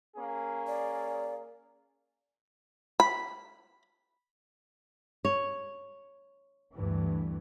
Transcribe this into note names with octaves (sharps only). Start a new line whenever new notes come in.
A#3 C#4 G#4
D5
B5
C#5
D2 G2 E3